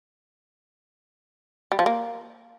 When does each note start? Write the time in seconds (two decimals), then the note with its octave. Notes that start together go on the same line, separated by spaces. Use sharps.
1.72 G3
1.79 F3
1.86 A#3